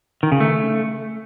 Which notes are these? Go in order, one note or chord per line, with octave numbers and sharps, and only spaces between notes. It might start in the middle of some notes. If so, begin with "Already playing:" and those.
D#3
C#3
A3